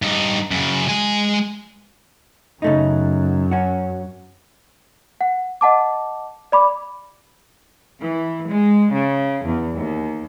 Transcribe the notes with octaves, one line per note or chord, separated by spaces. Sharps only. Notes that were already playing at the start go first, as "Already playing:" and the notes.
G2 D#4
F#2 C#3
G#3 G#5
F#2 C#3 A3 D#4
C#4 F#4
F#5
D#5 F#5 A5 D6
D5 B5 D6
E3
G#3
C#3
E2
D#2